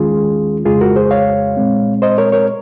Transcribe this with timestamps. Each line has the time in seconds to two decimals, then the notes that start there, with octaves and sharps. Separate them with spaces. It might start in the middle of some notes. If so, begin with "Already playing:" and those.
Already playing: D#2 D#3 G#3 C#4 F4 G#4
0.65 F2 C#3 G#3 F4 G#4
0.81 F#4 A#4
0.96 G#4 C5
1.11 C#5 F5
1.57 A#2 G#3 C4
2.02 C5 D#5
2.18 A#4 C#5
2.32 A#4 C#5